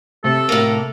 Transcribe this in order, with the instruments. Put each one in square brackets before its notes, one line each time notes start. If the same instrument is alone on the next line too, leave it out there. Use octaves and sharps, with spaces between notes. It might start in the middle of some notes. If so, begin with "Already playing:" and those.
[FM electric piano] C3 A3 [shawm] A4
[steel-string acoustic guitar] A2 A#3